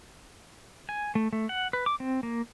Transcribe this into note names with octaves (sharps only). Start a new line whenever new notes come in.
G#5
A3
A3
F#5
B4
D6
C4
A#3